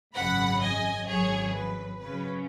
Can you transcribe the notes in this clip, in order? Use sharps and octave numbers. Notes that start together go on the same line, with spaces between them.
G#1 F#2 C#3 F#5 B5
D#5 G#5
G#1 F#2 F#3 G#4 C#5
B4
F#2 C#3 F#3 C#4 B4